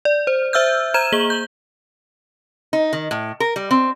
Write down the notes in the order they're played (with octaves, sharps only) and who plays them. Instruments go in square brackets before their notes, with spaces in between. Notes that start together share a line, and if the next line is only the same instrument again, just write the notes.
[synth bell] D5
C5
C5 E5 E6 F6 G6
C5 A#5 G#6 D#7 E7
A#3 G#4 F#7 G7
G6
[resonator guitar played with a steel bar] D#4
D#3
A2
A#4
G3
C4